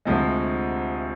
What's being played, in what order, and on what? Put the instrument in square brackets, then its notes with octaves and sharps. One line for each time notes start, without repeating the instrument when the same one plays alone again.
[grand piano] D2 C3 F3 G#3